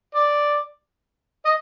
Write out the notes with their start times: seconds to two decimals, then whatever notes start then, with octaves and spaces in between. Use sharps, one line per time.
0.15 D5
1.45 D#5